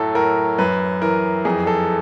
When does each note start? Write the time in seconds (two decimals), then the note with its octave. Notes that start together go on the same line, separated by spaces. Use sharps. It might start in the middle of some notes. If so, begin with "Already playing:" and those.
Already playing: F#2 A2 F#3 A4
0.15 A2 A#4
0.58 F#2 B4
1.02 E3 A#4
1.45 F2 G#4
1.67 A4